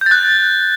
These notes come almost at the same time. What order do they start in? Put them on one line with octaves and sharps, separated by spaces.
G6 A6 F#6